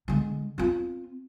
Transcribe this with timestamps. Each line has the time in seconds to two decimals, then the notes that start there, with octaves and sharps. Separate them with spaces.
0.08 D3 G#3
0.58 C4 F4